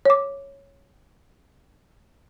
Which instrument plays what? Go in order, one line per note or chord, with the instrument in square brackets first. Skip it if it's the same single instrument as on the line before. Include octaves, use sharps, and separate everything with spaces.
[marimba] C#5 D6